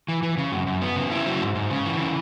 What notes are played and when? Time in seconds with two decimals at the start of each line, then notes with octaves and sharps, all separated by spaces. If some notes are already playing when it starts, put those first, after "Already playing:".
0.08 E3
0.23 E3
0.37 C#3
0.52 F#2
0.67 F#2
0.82 B3
0.96 C#3
1.11 E4
1.26 F#3
1.41 G#2
1.55 G#2
1.70 C#3
1.86 E3
1.99 C#3